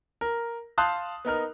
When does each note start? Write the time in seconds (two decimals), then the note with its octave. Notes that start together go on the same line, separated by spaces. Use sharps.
0.21 A#4
0.78 F5 A5 C6 D#6 F#6 G6
1.25 B3 D#4 A#4 F6